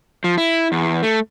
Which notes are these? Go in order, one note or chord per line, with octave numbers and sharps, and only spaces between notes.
F3
E4
E2
A3